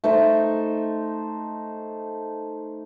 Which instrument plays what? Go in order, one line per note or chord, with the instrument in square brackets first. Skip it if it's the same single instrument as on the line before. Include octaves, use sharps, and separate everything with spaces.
[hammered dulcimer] A3 D#4 C5